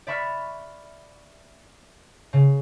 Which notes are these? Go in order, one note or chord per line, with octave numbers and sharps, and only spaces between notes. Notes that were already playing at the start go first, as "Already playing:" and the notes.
D5 E5 B5 C#6 F6 F#6
C#3